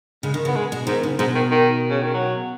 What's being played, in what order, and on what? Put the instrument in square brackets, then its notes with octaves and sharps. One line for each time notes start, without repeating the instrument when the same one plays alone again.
[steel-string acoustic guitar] C#3 [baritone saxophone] G#3
[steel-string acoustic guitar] D#3
[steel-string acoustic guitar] C#3 [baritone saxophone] B3
[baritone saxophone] G#3
[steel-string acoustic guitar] B2
[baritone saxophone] G#2 [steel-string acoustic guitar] D#3
[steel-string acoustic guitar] C#3
[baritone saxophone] G#2 [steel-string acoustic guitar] B2
[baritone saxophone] D#3
D#3
C#3
D#3
F#3